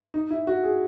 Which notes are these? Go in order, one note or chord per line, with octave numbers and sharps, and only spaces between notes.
D#4
E4
F#4
G#4